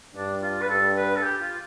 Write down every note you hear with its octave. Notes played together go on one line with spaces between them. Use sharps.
G2 D4
F4
B4
G2 A4
B4
A4
G4
F4